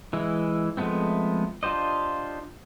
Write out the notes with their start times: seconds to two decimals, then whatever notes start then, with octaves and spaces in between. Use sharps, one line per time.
0.13 E3 G#3 E4
0.77 F3 G#3 A3 B3 C4
1.63 D4 F4 G4 C5 D#5